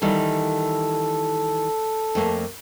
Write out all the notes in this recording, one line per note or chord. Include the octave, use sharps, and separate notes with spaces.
D#3 E3 G3 A4
F2 A3 A#3